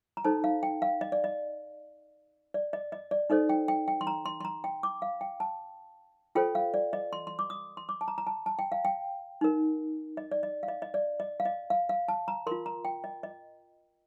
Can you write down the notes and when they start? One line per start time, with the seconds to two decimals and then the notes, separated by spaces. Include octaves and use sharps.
0.17 A#5
0.24 D#4 A4 C5 A5
0.44 F5
0.63 G5
0.82 F5
1.01 D#5
1.12 D5
1.24 D#5
2.54 D5
2.73 D#5
2.92 D#5
3.11 D5
3.30 D#4 A4 C5 D#5
3.49 G5
3.68 G5
3.88 G5
4.01 C6
4.07 A#5
4.26 C6
4.40 C6
4.45 A#5
4.64 G5
4.83 D6
5.02 F5
5.21 G5
5.40 A5
6.35 F4 A4 C5 G5
6.55 F5
6.74 D5
6.93 D#5
7.13 C6
7.27 C6
7.39 D6
7.50 D#6
7.77 C6
7.89 D6
8.01 A5
8.08 A#5
8.18 A#5
8.27 A5
8.46 A5
8.59 G5
8.72 F5
8.85 G5
9.41 D#4 A#4
10.17 D#5
10.31 D5
10.43 D#5
10.63 F5
10.68 D#5
10.82 D#5
10.94 D5
11.20 D#5
11.40 F5
11.45 D#5
11.70 F5
11.89 F5
12.08 A5
12.28 A#5
12.47 F4 A#4 C6
12.66 A#5
12.85 G5
13.04 D#5
13.23 D#5